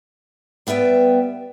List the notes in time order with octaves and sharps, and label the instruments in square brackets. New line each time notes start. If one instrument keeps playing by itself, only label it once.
[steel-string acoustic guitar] G3 B3 E5 F#5 G5